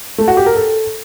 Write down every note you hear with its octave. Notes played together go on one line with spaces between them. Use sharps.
A3
F#4
G4
A#4
A4